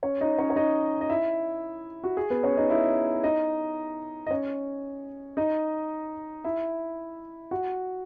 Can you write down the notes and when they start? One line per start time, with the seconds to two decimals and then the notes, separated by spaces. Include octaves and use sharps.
0.03 C#4 C#5
0.21 D#4 D#5
0.39 C#4 C#5
0.50 C#5
0.56 D#4 D#5
1.01 D#5
1.10 E4 E5
2.04 F#4
2.17 G#4
2.30 B3 B4
2.43 C#4 C#5
2.57 D#4 D#5
2.70 E4 E5
3.23 D#4 D#5
4.27 D#5
4.31 C#4 C#5
5.37 D#4 D#5
6.44 E4 E5
7.51 F#4 F#5